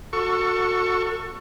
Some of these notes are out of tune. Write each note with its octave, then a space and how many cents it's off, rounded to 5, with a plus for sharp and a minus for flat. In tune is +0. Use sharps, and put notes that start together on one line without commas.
F#4 -20 A4 +25 C#6 +0